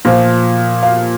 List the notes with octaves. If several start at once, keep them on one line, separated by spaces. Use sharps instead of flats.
A#2 F3
F5